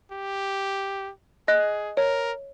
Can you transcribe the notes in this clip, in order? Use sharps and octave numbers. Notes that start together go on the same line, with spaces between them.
G4
G#4 D#5 F#6
A#4 C#5